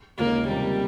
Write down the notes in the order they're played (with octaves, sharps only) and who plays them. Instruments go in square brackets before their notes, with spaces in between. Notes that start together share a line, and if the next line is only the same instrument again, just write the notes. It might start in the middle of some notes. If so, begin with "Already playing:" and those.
[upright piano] D#2 C#3 G#3 D#4 [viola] A#3
[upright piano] C#2 C3 D#3 A#3 [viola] G3